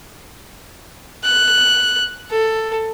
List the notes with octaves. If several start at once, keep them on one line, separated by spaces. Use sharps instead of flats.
F#6
A4